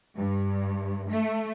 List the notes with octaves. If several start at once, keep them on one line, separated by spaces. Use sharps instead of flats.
G2
A3